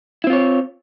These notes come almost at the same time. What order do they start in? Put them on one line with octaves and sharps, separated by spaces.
E4 C4 F4 C#5